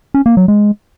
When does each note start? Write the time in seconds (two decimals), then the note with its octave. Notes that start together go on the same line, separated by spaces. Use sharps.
0.14 C#4
0.26 A#3
0.37 F#3
0.48 G#3